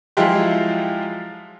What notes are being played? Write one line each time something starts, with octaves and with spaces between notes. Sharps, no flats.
F3 F#3 G#3 E4 F4 G4